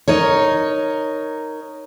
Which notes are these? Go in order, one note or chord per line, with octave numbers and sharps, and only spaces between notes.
D#4 A#4 C#5